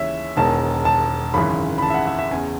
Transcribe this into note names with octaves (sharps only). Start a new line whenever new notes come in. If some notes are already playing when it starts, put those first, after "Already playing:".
Already playing: D#2 C#3 E3 C#5 E5
E1 E2 D#3 A5
A5
G#1 F#2 C#3 E3 B5
B5
A5
E5
F#5
E5
E5
E2 C#3 G#5